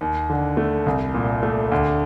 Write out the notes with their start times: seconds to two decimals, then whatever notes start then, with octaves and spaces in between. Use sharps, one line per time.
0.01 D#2
0.30 D3
0.57 A3
0.86 C2
1.14 A#2
1.43 A3
1.72 D2